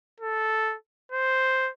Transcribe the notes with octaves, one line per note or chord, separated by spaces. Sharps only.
A4
C5